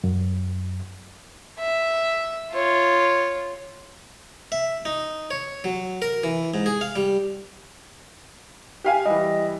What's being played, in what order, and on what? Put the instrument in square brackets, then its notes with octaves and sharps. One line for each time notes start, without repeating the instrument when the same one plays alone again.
[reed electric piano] F#2
[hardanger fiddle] E5
F4 C#5
[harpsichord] E5
D#4
C#5
F#3
A#4
E3
G#2
G#4
F5
G3
[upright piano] G4 F5 G#5
[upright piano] E3 G3 [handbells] D#5